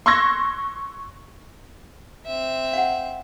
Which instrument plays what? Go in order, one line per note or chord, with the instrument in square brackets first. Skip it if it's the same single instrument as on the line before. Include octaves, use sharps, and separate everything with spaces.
[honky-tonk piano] C6 C#6 E6 F#6 G#6 A#6
[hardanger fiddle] C4 E5
[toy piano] F5 F#5